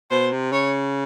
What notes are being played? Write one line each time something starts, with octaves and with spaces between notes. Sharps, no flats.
B2 C5
C3
C#3 C#5